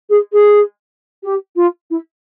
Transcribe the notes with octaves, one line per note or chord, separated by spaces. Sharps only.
G#4
G#4
G4
F4
E4